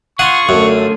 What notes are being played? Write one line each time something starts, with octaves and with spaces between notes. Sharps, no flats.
F4 G#4 F#5 C#6
F#2 D3 A3 C#4